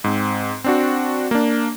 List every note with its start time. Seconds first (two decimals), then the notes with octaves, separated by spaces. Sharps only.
0.04 G#2 C4
0.64 C4 D4 F#4
1.31 A#3 D4